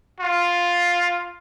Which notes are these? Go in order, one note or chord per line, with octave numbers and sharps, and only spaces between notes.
F4